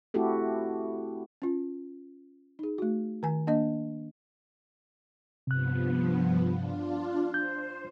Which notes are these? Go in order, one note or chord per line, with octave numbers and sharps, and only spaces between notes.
A3 C4 E4 F#4 G4 A4
C#4 F4
D#4 G#4
A3 F#4
D#3 G#5
A#3 D4 D#5
G2 C3 F3 B3 F#6
D4 F4
C5 G6